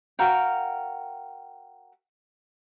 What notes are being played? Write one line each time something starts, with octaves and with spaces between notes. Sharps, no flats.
F#4 A#4 F5 G5